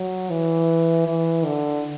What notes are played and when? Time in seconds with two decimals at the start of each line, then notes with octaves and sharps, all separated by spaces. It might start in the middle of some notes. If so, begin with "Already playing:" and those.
Already playing: F#3
0.31 E3
1.08 E3
1.46 D3